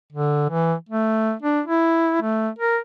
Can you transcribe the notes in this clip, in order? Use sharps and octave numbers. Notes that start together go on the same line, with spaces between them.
D3
E3
A3
D4
E4
A3
A#4